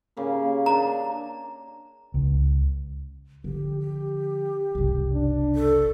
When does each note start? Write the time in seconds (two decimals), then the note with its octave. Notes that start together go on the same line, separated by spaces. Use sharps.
0.17 C#3 A#3 A#4
0.66 D4 A#4 A#5
2.14 C#2
3.44 D3 F3 G4
3.80 G4
4.75 F#1 C2
5.13 D4
5.55 A4